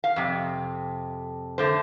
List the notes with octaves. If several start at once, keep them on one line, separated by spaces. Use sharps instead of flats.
F5
F2 C3
D3 A3 C5